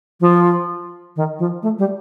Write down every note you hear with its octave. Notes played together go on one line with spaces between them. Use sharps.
F3
D#3
F3
A3
G3